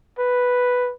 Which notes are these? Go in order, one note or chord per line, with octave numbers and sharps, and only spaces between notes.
B4